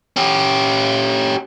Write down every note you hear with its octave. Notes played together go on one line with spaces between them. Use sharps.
C#4 G4